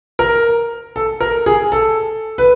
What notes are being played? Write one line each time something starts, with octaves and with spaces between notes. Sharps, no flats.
A#4
A4
A#4
G#4
A4
B4